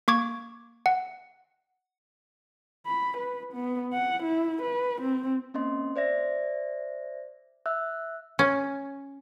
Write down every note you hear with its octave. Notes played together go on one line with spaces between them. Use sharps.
A#3 C#6 D6 G#6
F#5
B5
B4
B3
F#5
E4
B4
C4
A#3 C4 C#4 D#5 C6
C5 D5 E5 A#6
E5 E6 F#6
C#4